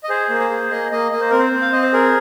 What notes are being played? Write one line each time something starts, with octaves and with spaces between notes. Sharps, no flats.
D#5
G#4 C5
A#3
C5
G#4
A#3 D#5
A#3 D#5
A#3 D#5
C5
C4 A#4
C5
C4
F5
C4 D#5
C5
G#4 A#4